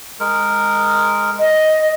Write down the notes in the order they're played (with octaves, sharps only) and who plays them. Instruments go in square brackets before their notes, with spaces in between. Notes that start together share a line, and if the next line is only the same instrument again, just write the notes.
[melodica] G#3 A#4
[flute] D#5